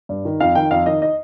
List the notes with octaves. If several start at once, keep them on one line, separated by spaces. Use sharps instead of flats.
G2
D#3
F2 F5
D#3 G5
F2 F5
D#3 D#5
D#5